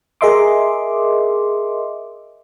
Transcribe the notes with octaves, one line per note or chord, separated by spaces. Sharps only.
G#4 A#4 D#5 E5 C6 D6